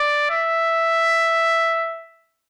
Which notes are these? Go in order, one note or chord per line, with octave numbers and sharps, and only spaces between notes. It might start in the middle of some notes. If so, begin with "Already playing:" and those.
Already playing: D5
E5